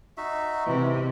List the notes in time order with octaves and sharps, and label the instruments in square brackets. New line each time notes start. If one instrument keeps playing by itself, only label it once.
[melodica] D#4 F#4 E5
[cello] C3 [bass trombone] E3 [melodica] G#3